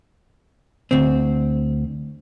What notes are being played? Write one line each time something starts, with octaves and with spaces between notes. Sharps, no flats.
D2 C4